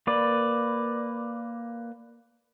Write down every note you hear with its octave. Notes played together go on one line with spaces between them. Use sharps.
A#3 B4 D5